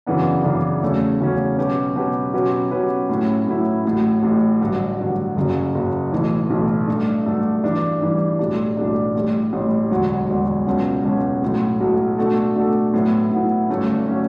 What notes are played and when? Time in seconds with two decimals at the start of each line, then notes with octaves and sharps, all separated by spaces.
0.07 F#2 C#3 E3 B3 D4
0.44 F#2 C#3 E3 B3 D4
0.83 E2 C#3 F#3 A3 C#4
1.20 E2 C#3 F#3 A3 C#4
1.58 B2 F#3 C#4 G4 B4
1.96 B2 F#3 C#4 G4 B4
2.33 B2 F#3 C#4 G4 B4
2.71 B2 F#3 C#4 G4 B4
3.09 A2 F#3 C#4 E4
3.47 A2 F#3 C#4 E4
3.85 A1 A2 F#3
4.23 A1 A2 F#3
4.61 A1 G2 D3 F#3
4.99 A1 G2 D3 F#3
5.36 F#1 F#2 C#3 F#3
5.74 F#1 F#2 C#3 F#3
6.12 B1 A2 E3
6.50 B1 A2 E3
6.88 G2 F#3 A3 D4
7.26 G2 F#3 A3 D4
7.64 G2 E3 G3 D4
8.01 G2 E3 G3 D4
8.39 B1 A2 G3 D4
8.77 B1 A2 G3 D4
9.15 A1 A2 G3
9.53 A1 A2 G3
9.91 E1 D2 D3 F#3
10.29 E1 D2 D3 F#3
10.67 C#2 B2 F#3 C#4
11.04 C#2 B2 F#3 C#4
11.42 B1 A2 F#3
11.80 B1 A2 F#3
12.18 B2 A3 D4 F#4 A4
12.56 B2 A3 D4 F#4 A4
12.94 A2 F#3 B3 E4
13.32 A2 F#3 B3 E4
13.69 G1 G2 F#3 A3 C#4
14.08 F#3 A3 C#4